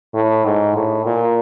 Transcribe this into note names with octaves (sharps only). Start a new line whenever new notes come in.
A2
G#2
A2
A#2